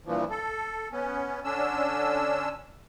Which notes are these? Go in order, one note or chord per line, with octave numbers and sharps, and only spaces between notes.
G2 A#2 E3 F3
A4
B3 C#4
D3 C#4 D4 E6